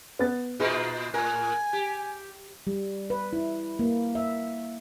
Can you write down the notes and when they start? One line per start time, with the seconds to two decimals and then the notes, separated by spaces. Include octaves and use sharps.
0.19 B3 A6
0.60 A#2 D#4 F4 G#4
1.14 A2 A#4 G#5
1.73 G4
2.67 G3
3.10 B4
3.33 E4
3.79 A#3
4.15 E5